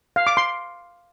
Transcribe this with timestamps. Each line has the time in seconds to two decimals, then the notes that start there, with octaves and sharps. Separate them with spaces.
0.16 F5
0.27 D6
0.37 C6